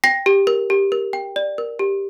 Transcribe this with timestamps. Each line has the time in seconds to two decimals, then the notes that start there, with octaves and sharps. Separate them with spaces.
0.04 G5 A#6
0.26 G4
0.47 A#4
0.70 G4
0.92 A#4
1.13 G5
1.36 D5
1.58 A#4
1.79 G4